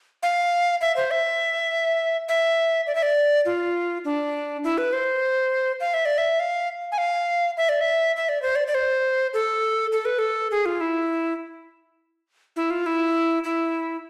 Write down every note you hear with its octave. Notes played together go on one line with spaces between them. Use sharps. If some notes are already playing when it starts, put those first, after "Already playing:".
F5
E5
C5
E5
E5
D5
E5
D5
F4
D4
E4
B4
C5
F5
E5
D5
E5
F5
G#5
F5
E5
D5
E5
E5
D5
C5
D5
D5
C5
A4
A4
B4
A4
G#4
F4
E4
E4
F4
E4
E4